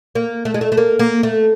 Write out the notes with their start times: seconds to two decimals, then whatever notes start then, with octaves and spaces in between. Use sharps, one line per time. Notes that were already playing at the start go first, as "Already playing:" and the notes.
0.15 A#3
0.45 A3
0.54 G#3
0.61 A3
0.72 A3
0.77 A#3
0.99 A#3
1.23 A3